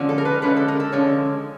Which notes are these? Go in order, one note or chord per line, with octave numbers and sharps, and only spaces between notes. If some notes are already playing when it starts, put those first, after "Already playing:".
Already playing: D3 F3 G#3 C#4
A4
A#4
B4
D3 F3 G#3 C#4 B4
A4
A#4
A4
D3 F3 G#3 C#4 C#5